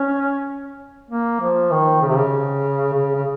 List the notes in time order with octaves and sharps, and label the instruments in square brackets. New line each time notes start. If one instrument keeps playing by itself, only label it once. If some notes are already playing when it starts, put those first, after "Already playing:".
Already playing: [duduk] C#4
A#3
F3
D#3
C#3
C3
C#3
C#3
C#3